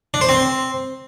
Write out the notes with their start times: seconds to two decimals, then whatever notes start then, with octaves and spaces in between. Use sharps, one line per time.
0.14 D4
0.21 C5
0.29 C4